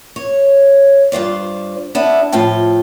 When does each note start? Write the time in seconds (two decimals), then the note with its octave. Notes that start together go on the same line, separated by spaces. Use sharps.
0.16 C#5
1.12 G2 F4 C5 D5
1.95 B3 D4 E4
2.32 A2 F3 F4 G5 A5